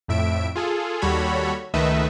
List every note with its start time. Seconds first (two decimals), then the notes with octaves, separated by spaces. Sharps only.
0.08 F2 A2 E5 D7
0.55 F4 G#4 A4
1.01 D#2 G3 F#4 A4 C#5 B5
1.74 C#2 D#3 A3 B4 D#5 E5